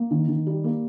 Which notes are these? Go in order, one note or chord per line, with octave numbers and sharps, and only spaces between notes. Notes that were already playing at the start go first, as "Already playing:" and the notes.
Already playing: A#3
D#3
D#3
G3
A#3